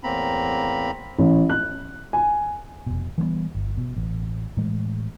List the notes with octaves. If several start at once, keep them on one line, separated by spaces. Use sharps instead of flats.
E2 A2 A#3 C4 A#5 B5
A1
F#6
G#5
F1 B2
E3 G3 G#3 B3
G1
B2
A1
A2 E3 G#3 A3